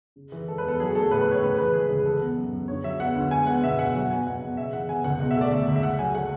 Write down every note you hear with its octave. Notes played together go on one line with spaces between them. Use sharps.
C#3
E3
G#3 A4
B4
E2 A4
F#3 G#4
A3 A4
A2 B4
B4
A2 C#5
C#3 B4
E3 B4
G#3 G#4
C#2
E3 A4
B3
F#2
F#2
D3 C#5
F#3 E5
B3 F#5
D2
G#3 G#5
B3 F#5
B2 E5
B2 F#5
F#3 F#5
B3 G#5
B2 F#5
B2
C#3 E5
E3 F#5
B3 G#5
C#2 F#5
B2 F#5
E5
A3 D5
C#2 E5
C#2
E5
C#3 F#5
F#3 G#5
A3 F#5